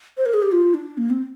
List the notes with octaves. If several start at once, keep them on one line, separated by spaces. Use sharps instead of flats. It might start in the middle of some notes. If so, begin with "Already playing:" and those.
C5
A#4
G#4
G4
F4
D4
A#3
C4